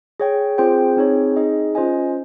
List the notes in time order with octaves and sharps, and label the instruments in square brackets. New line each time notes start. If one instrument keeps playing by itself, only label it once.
[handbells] G#4 C#5 G5
C4 F4 G#4 C5 G5
C4 D#4 G#4 C#5
D#4 G#4 D#5
C#4 F4 C5 D#5 G#5